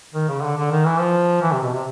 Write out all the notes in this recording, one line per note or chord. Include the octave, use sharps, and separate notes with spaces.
D#3
C#3
D3
D3
D#3
E3
F3
E3
C3
B2
C3